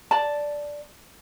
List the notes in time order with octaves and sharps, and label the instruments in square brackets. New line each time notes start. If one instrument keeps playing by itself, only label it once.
[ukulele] D5 A5